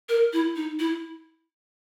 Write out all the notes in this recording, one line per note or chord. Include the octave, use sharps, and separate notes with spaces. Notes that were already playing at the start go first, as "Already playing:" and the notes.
A#4
E4
D#4
E4